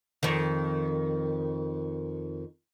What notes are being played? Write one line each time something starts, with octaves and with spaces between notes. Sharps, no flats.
F2 D#3